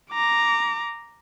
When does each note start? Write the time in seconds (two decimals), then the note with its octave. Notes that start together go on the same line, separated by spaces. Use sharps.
0.11 A#5 D6